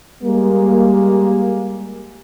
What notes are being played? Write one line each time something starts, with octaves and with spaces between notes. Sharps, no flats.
G3 G#3 A#3